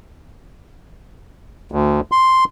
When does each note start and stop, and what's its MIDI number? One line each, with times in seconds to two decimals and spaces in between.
1.72 2.00 38
2.12 2.44 84